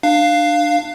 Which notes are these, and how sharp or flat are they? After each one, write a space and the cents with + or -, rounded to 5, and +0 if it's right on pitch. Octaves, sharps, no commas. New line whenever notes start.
D4 +25 F5 +0